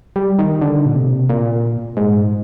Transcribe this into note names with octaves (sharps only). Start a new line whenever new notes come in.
G3
D#3
D3
A#2
C3
A#2
G#2